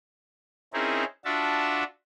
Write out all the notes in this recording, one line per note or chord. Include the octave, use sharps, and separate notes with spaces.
C4 C#4 D#4 E4 G#4 A#4
D4 F4 F#4 E5 A5